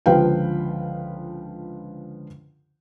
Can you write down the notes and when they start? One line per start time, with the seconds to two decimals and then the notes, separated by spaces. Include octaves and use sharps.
0.06 C#2 D3 F3 B4 F5 G5